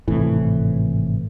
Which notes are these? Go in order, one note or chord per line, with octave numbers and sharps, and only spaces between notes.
G#1 A2 C3 E3